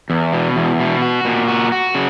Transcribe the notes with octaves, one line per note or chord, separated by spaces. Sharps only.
E2
B2
E2
B2
F#4
A#2
F#4
F#4
C#3